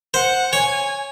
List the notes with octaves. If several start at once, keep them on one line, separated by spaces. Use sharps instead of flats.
C5 F#5
C#5 G#5